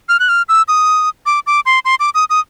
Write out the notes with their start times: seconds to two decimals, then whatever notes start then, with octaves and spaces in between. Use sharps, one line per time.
0.09 F6
0.20 F#6
0.29 F6
0.49 E6
0.68 D#6
1.26 D6
1.47 D6
1.66 C6
1.85 C6
2.00 D6
2.15 D#6
2.30 D#6